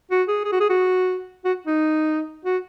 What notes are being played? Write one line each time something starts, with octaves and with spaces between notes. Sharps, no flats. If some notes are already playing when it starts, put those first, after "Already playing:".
F#4
G#4
G#4
F#4
G#4
F#4
F#4
D#4
F#4